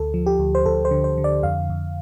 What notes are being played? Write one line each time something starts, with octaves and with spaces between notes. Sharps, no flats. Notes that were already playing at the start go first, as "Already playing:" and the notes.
Already playing: D2 A4
F3
G4
D2
C5
D2 A4
C5
D3
C5
D3
D5
F2 F5
F2